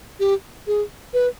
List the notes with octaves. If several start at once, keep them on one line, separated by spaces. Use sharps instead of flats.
G4
G#4
B4